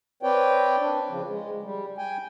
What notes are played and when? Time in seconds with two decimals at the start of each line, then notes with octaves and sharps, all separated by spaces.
0.23 C4 B4 C#5 D5 G5
0.80 D4
1.10 C#3 F3
1.28 G#3
1.62 G3
1.98 G5 G#5